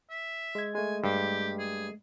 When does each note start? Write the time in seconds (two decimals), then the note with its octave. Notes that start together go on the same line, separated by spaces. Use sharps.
0.10 E5
0.55 G#3 G#6
0.75 G#3 A3 G#5
1.04 G2 G4
1.59 G#4